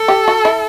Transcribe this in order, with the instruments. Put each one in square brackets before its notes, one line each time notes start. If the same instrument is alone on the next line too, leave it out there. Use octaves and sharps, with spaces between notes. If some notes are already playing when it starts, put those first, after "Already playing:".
Already playing: [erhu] A4
[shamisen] G4
F#4
E4